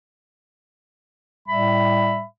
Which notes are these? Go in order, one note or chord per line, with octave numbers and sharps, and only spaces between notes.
A2 G3 E5 B5